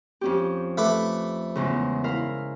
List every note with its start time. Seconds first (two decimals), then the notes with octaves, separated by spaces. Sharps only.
0.21 F2 C#4 G4
0.78 A3 B4 D6
1.55 E2 G#2 C#3
2.04 E4 A#4 F5